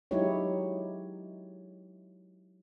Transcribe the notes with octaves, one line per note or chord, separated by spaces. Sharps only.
F#3 G#3 D#4 E4 G4 C#5